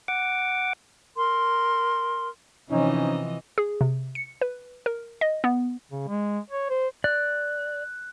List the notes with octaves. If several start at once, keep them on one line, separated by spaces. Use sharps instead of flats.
F#5 D6
A#4 C6
C3 E3 F3 C#4 D#4 D#5
G#4
C3
C#7
B4
A#4
D#5
B3
C#3
G#3
C#5
C5
D5 F#6